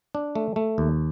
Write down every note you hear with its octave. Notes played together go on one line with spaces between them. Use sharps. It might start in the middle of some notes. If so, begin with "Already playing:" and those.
D4
A3
A3
D#2